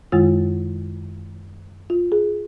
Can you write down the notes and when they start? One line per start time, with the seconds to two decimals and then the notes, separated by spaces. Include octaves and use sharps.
0.12 F#2 D#3 G#3 F4
1.90 F4
2.12 G#4